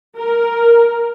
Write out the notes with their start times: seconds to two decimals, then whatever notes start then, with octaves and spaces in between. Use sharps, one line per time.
0.16 A#4